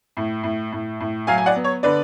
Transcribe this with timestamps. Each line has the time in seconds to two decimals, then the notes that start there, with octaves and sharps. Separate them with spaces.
0.17 A2
0.43 A2
0.72 A2
1.00 A2
1.27 F#3 F5 G#5
1.38 G#5
1.46 D5 F#5
1.56 B3
1.64 C#5
1.83 D3 B4 D5